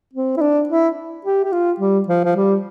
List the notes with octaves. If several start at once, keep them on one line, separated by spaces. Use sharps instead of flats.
C4
E4
D4
E4
G4
G4
F4
G3
F3
F3
G3